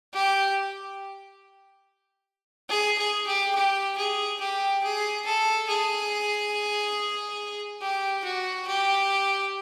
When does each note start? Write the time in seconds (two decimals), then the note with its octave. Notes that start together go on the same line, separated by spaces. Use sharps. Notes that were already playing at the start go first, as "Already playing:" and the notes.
0.13 G4
2.69 G#4
2.98 G#4
3.27 G4
3.55 G4
3.97 G#4
4.40 G4
4.83 G#4
5.25 A4
5.68 G#4
7.81 G4
8.24 F#4
8.67 G4